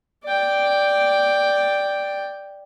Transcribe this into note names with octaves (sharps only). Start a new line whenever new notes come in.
D5 G5